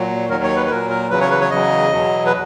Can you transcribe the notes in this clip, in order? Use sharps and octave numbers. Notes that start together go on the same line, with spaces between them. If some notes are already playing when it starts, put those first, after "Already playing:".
Already playing: A#2 F#3
D#2 D#3 F#3 A#4
C#5
B4
B4
A#2 F#3 A#4
A#4
E2 C#3 F#3 B4
C#5
B4
C#5
E2 C#3 F#3 D#5
E2 B2 F#3
B4